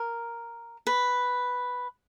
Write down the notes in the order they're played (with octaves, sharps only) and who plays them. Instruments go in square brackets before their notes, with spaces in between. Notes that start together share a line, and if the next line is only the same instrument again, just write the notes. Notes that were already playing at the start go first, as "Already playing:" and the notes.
Already playing: [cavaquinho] A#4
B4